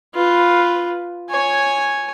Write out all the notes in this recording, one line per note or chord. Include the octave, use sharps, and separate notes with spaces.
F4 B4
C#5 G#5